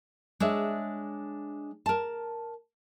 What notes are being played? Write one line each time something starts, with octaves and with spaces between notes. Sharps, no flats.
G#3 D4 C#5 E5
A#4 A5